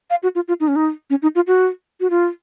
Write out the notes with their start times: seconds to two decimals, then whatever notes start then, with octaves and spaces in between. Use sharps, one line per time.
0.10 F5
0.23 F#4
0.35 F4
0.48 F4
0.60 D#4
0.68 C#4
0.76 D#4
1.10 C#4
1.22 D#4
1.35 F4
1.47 F#4
2.00 F#4
2.10 F4